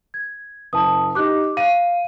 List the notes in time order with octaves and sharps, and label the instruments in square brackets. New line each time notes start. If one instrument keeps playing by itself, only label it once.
[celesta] G#6
[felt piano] F#1 [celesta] A5 D#6
[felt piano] D#4 G4 [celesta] D6 F#6
[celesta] F5 [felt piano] D#7